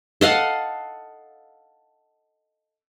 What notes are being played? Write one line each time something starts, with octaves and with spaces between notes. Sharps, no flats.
A4 D#5 F5 F#5